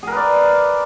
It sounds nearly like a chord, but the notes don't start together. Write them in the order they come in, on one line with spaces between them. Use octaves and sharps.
G#4 A#4 B4 D5